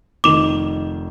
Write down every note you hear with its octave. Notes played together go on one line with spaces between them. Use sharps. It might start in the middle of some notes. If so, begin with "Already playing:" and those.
F1 D#3 D6 E7